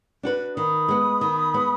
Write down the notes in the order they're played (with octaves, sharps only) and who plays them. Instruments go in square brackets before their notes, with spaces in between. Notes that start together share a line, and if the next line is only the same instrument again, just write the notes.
[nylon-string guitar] D4 F#4 B4
[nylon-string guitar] D#3 [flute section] B5 D#6
[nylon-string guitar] G#3 B3
D#3
G#3 B3